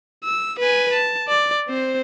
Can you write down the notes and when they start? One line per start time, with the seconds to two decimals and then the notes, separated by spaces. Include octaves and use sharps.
0.24 E6
0.59 B4 G#5
0.94 A5
1.28 D5
1.68 C4 C5